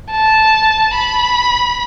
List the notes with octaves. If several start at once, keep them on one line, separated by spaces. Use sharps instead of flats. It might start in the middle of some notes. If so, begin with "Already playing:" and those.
A5
B5